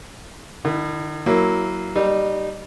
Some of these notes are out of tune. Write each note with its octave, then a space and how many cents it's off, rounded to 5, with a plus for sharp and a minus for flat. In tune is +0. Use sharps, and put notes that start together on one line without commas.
D#3 -45 E4 +0
F#3 +10 A#3 +0 E4 +0
G3 -10 D#4 -30